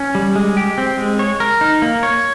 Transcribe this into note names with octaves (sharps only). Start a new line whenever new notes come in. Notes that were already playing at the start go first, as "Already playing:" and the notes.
Already playing: C#4
G3
G#3
G4
C4
G#3
C#5
A#4
D#4
A#3
C#5